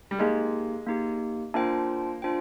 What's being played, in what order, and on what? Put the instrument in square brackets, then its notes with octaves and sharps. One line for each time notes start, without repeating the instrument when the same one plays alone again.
[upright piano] G3
[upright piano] G#3 [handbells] A#3 D#4 G4
[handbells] A#3 D#4 G4
[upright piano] A#3 [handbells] D4 F4 C5 G5
[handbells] D4 F4 C5 G5